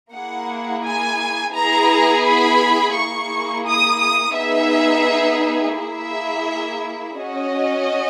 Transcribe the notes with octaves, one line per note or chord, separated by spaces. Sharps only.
A#3 E4 G#4 F#5
G#5
B3 E4 G#4 A#5
B5
A#3 E4 G#4 C#6
D#6
D#6
B3 D#4 G#4 E5
A#3 E4 G#4 E5
C#4 F#4 D#5